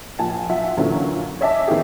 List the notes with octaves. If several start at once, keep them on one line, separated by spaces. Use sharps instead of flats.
A#1 A#2 G#5 A5
B1 F4 E5 F#5
F#2 A#2 D3 E3 F#3 C#4
C#5 D#5 E5 G#5 A5 D6
D#3 B3 C#4 E4 G4 G#4